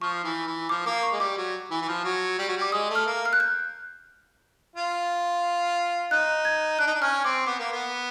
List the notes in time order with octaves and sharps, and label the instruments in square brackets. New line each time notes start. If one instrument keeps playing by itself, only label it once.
[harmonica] F3 [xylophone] C#6
[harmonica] E3
E3
[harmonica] F3 [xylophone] D6
[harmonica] A#3 [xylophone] D6
[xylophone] C#6
[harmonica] G#3
[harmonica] G3 [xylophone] D6
[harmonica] F#3
E3
E3
F3
F#3
G3
F#3
[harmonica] G3 [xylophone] D6
[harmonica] G#3 [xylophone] D#6
[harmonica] A3
[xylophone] F6
[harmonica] A#3
[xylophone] F6
F#6
G6
[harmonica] F4
[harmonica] D#4 [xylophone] F#6
[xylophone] G#6
[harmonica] D4 [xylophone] F#6
[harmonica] D#4
D4
[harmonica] C#4 [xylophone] F6
[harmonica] C4 [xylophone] D6
[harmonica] B3 [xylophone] D6
[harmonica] A#3
B3